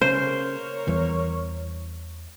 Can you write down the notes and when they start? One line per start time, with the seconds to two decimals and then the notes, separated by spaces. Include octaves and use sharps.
0.01 C#3 A#3 A#4 C5 C#5
0.87 E2 E3 G3